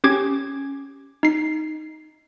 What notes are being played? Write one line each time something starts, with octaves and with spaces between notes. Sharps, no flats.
C#4 G4 D6 G#6
D#4 C7